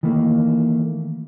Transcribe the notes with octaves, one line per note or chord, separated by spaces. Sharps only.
D#3 E3 A3 A#3